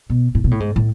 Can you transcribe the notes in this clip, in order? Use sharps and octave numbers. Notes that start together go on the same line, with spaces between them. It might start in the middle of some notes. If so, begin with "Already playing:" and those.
B2
A2
B2
A2
G#2
A2